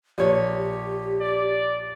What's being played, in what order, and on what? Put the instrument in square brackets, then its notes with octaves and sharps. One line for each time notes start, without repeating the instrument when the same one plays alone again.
[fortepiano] A#1 C#5 [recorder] G4
[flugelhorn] D5